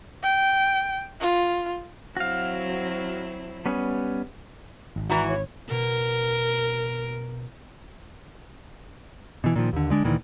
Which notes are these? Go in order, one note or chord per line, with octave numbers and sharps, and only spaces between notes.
G5
F4
F#3 C4 E4 F#4 F5
G3 B3 C#4
G#1
E3 E4 F#4 A#5
C#5
B2 A#4
B2 E3
A#2 D#3 F3
D#2 D3
D3 G#3 D4
D2 A#2 D#3 E3